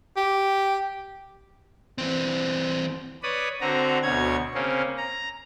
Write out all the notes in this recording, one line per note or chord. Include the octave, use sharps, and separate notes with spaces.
G4
E3 C4
B4 C#5 D5 B5 D#6
D3 C4 F#4 A#5
D2 B2 C#5 G#6
C#3 A#3 C4 C#4
A#5